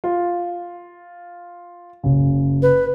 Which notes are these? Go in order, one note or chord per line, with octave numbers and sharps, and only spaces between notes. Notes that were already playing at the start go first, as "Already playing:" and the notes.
F4
F#1 C#3
B4